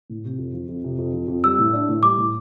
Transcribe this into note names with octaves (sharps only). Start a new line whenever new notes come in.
A2
C3
F2
F3
F2
C3
F2
F3
F2
G3 E6
A2
D4
A2
G3 D6
A2